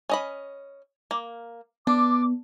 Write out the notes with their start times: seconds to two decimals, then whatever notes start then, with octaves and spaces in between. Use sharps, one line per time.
0.09 C#4 D#5 B5
1.11 A#3
1.87 B3 D4 D6